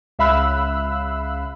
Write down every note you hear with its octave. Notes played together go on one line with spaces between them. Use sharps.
C#2 E5 F5 B5 E6 F#6